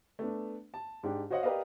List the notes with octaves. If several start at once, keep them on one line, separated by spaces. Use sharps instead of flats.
A3 B3 D4
A5
G#2 D4 G4
F#4 C5 C#5 D#5 F5 F#5
G4 A#4 B4 D5 D#5 F5